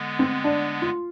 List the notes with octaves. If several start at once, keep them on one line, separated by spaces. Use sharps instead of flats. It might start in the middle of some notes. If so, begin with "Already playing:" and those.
Already playing: D3 G#3 B3
C4
D4
F4